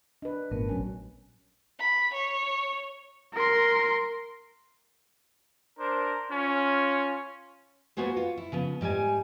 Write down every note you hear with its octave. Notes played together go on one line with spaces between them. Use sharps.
D4 B4 D#5
G#1 A#2 A3 B3 A#4
A#1 F#3 C#4 G#5
B5
C#5
A#4 C6
D4 A#4 C5
C#4 F4
A#3 B3 F#4 G#4 C5 C#5
F4 C#5
E4
C#3 F3 B3
G#2 G3 B4 G#5